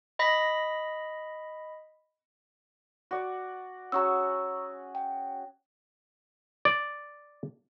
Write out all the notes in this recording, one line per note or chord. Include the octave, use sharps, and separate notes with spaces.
D#5 B5 A#6 B6
F#4 D5
C#4 F#4 G#4 A#5 C#6 E6
G5
D5